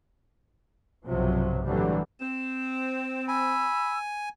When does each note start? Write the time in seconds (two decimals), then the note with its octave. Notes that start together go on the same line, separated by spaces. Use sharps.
1.06 B1 G2 C3 F3 F#3
1.65 A2 D3 E3 F#3 G3
2.20 C4 E7
3.28 G#5 B5 E6